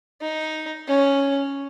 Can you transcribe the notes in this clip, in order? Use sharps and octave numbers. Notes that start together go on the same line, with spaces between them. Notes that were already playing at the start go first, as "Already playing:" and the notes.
D#4
C#4